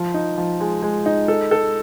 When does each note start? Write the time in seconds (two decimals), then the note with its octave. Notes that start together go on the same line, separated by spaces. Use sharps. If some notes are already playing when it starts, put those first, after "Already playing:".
Already playing: F3
0.14 D#4
0.38 F3
0.60 G#3
0.82 G#3
1.06 D#4
1.28 A4
1.51 A4